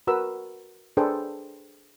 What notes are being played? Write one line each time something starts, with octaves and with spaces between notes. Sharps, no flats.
F#4 A#4 B4 E6
D4 G#4 A4 B4 C5 G5